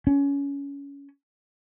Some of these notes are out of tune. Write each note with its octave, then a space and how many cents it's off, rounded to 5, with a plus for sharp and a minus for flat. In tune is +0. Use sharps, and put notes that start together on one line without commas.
C#4 +20